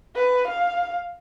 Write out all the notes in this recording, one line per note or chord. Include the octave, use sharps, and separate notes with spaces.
B4
F5